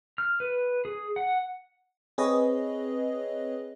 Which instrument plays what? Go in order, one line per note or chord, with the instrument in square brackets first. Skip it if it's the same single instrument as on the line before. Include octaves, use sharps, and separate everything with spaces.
[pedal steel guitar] F6
B4
G#4
F#5
[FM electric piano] C4 G#4 B4 C#5 D#5